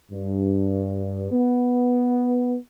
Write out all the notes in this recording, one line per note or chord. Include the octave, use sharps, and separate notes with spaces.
G2
B3